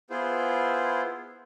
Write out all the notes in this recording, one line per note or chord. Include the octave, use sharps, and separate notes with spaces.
B3 E4 F4 G#4 C5